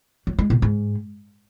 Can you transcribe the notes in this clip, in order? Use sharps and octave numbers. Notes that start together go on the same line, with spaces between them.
F#3
G#3
B2
G#2